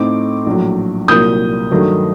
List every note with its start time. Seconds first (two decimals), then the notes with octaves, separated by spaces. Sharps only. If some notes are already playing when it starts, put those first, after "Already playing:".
Already playing: A2 A3 C4 D#4 D6
0.46 A#1 A2 F#3
1.08 C2 A#2 F#3 A#3 D#6 G6
1.71 G2 D#3 F#3 A3